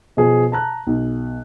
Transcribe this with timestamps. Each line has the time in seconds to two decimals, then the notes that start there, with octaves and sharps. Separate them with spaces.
0.17 B2 F3 G#4
0.52 A5 A#5 F#6
0.87 B1